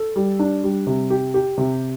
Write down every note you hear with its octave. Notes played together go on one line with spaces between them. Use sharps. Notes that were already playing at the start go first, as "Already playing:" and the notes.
Already playing: A4
G3
D4
G3
C3
G4
G4
C3